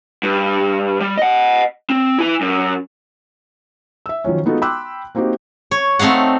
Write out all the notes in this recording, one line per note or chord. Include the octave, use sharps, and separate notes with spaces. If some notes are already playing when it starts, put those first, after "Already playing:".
G2
G3
D#5 F#5
C4
E4 G#5
F#2
E5 E6
D#3 F3 F#3 C#4
G#3 B3 D#4 F4 F#4 A4
G5 B5 C6 D6 E6 F#6
A#3 C4 D#4 F#4 G4
C#5
A3 C4 D#4 F5 F#5